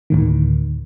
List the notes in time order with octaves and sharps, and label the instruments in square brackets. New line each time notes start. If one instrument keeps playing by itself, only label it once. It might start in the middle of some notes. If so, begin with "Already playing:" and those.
[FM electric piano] D2 A2 D#3